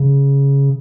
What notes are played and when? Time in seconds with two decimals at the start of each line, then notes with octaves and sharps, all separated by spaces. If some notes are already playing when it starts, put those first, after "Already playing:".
Already playing: C#3